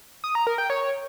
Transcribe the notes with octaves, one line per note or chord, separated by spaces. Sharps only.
D#6
A#5
A#4
G5
C#5